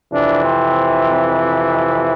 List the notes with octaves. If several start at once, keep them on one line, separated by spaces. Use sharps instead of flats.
F2 C3 E3 D4
C4